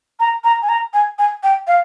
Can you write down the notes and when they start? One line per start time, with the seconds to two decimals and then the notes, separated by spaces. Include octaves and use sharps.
0.20 A#5
0.44 A#5
0.62 G#5
0.69 A#5
0.94 G#5
1.19 G#5
1.43 G5
1.67 F5